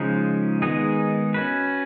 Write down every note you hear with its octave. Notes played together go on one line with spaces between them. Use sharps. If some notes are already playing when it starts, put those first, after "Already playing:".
Already playing: C#3 F3 G#3 D#4
D#3 G#3 B3 D#4 G#4
C#4 F#4 B4